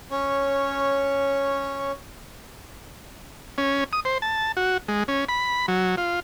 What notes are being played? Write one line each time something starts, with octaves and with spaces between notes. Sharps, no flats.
C#4 C#5
C#4
D#6
C5
A5
F#4
G#3
C#4
B5
F#3
F4